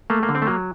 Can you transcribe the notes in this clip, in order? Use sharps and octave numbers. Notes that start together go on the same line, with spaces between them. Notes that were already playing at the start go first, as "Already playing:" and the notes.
A3 A#3
A#3
D3
C4
A3
F#3 A#3